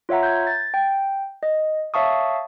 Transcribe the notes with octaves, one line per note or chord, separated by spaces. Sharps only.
F4 C#5 E5 F#5 A#5
G6 G#6
A6
G5
D#5
C#5 E5 F5 A5 C#6 D#6